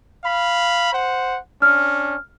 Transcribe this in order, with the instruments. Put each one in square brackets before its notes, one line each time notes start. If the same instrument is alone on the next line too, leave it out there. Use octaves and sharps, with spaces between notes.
[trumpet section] F5 B5
C5 F#5
[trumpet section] C#4 D4 [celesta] F6